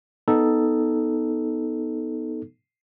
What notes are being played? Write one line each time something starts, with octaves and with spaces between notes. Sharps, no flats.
B3 D#4 A4